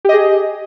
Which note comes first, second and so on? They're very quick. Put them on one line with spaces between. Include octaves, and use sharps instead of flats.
G4 D#5 G#4